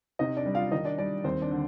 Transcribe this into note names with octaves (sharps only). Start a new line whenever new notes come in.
C3 D#4 D#5
D4 D5
G3
F4 F5
D#3 D#4 D#5
D4 D5
G3 D4 D5
D#2 C4 C5
D4 D5
D3